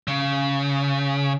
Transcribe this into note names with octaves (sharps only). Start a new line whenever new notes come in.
C#3